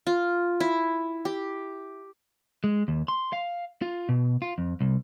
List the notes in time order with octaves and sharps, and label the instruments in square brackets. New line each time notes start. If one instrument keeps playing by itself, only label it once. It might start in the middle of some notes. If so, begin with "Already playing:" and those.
[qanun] F4
E4
G4
[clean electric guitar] G#3
D#2
C6
F5
F4
B2
F4
F2
C2